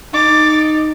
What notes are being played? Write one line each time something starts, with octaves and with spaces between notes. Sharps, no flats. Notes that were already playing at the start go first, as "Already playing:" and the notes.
D#4 D6 A6